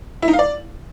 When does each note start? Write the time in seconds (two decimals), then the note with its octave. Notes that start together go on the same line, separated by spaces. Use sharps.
0.22 E4
0.28 D#4
0.33 F5
0.39 D5